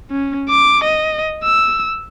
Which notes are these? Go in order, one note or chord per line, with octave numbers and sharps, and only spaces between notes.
C#4
D6
D#5
E6